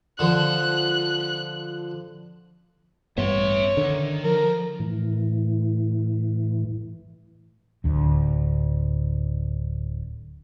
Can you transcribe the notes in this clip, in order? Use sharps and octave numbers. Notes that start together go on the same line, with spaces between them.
D3 F3 F#6
A1 G2 B3 C#5 E5 C6
D3 D#3
F3 A#4
A2 E3
D1 D2